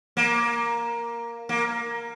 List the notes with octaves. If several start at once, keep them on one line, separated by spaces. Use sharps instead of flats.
A#3
A#3